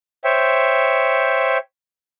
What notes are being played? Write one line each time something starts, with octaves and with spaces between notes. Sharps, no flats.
C5 C#5 E5 G5